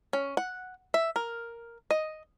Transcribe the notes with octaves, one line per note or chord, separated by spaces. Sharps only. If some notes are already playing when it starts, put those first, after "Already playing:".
C#4
F#5
E5
A#4
D#5